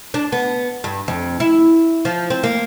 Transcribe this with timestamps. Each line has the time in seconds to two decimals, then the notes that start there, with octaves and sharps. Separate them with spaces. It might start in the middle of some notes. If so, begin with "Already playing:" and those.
0.14 D4
0.32 B3
0.84 G2
1.08 F2
1.40 E4
2.05 F3
2.30 C4
2.43 A#3